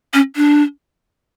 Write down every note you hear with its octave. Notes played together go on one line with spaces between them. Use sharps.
C#4
D4